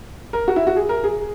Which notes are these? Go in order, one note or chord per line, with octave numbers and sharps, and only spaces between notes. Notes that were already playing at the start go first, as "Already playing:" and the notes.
A#4
F#4
E4
F#4
G#4
A#4
G#4